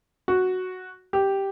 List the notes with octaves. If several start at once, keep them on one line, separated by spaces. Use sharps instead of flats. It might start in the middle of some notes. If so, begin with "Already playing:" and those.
F#4
G4